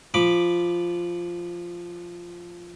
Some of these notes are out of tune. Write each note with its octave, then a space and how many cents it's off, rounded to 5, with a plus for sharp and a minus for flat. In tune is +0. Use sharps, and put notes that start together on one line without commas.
F3 -5 B5 +0 D6 +0